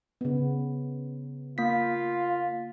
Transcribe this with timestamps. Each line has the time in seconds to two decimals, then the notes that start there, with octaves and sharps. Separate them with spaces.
0.21 C#3 B3
1.58 A#3 F4 B6